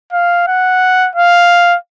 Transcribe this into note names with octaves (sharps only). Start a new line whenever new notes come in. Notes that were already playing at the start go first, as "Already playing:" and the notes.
F5
F#5
F5